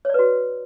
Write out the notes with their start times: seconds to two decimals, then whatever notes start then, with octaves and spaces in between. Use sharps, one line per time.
0.05 C#5
0.10 D5
0.14 B4
0.19 F#4